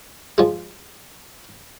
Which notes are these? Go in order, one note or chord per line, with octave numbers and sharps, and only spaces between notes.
F3 G#3